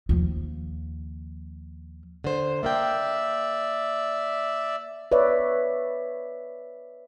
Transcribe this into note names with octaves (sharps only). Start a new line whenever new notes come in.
D#2 F3
D3 C5
A#3 A#4 D5 E5 G5
B4 C#5 D5 E5